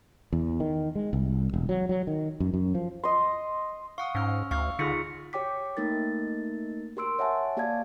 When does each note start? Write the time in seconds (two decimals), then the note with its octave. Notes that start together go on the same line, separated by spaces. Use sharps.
0.33 E2
0.60 D#3
0.95 G#3
1.13 C2
1.54 E1
1.69 F#3
1.89 F#3
2.07 D#3
2.40 F#2
2.54 F#2
2.75 F3
3.04 D#5 C6
3.98 F5 F#5 C#6 D#6
4.15 G#2 C#4 E6 F6
4.51 D2 F5 C#6 F6
4.79 D3 D#4 F4 G#4 C#6 B6 C#7
5.33 G4 C#5 G5 D6 B6
5.77 A3 A#3 D#4 A#4 A6
6.97 G4 A#4 C6 E6 D7
7.19 C#5 E5 F#5 G#5 A5
7.57 A#3 G4 D5 F5 A5 G#6